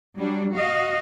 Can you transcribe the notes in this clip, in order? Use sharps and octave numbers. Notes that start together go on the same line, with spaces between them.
F#3 G3 D4
F#4 D#5 F5